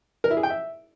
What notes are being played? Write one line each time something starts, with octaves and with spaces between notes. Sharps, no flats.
A#4
E4
G#4
G5
E5